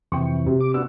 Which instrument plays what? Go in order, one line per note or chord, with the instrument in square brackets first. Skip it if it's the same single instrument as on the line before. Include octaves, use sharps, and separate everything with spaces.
[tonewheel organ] F2 C3 E3 [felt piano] G5 C#6
[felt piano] C3
[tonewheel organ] D6
[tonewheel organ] B3 D4 F#4 [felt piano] E6